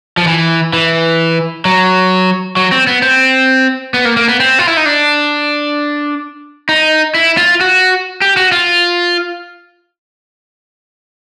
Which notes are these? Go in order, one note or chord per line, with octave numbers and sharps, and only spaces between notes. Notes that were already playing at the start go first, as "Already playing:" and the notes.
F3
E3
E3
F#3
F#3
C4
B3
C4
B3
A#3
A#3
B3
C4
F4
E4
D#4
D4
D#4
E4
F4
F#4
G4
F#4
F4